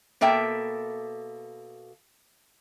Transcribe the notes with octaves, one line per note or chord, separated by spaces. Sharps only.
B2 A#3 A4 E5 G5